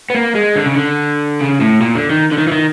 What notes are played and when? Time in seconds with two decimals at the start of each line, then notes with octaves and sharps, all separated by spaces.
0.10 B3
0.15 A#3
0.35 G#3
0.56 D3
0.66 C#3
0.76 D3
1.40 C#3
1.61 A2
1.81 A#2
1.95 D3
2.10 D#3
2.32 D3
2.38 D#3
2.47 E3
2.52 D#3